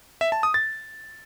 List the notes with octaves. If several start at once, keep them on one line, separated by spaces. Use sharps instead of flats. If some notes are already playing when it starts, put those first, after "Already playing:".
E5
A5
D#6
A6